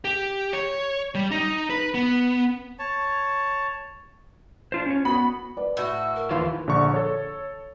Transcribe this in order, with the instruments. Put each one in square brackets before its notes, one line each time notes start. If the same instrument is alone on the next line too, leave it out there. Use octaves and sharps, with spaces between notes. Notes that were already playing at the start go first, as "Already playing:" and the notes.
[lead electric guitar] G4
C#5
G3
D#4
B4
B3
[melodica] C#5 A5
[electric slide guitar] D4 F4 C5
C#4 C#5
[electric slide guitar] B3 F#4 [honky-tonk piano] B5
[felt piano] B4 D5
[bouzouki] A2 F#4 [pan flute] E6
[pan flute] A#4
[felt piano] D#2 B4 [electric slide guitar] E3 F4
[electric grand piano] A#1 D3 D5 C#6
A4 C#5